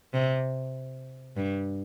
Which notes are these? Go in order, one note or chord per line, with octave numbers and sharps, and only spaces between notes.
C3
G2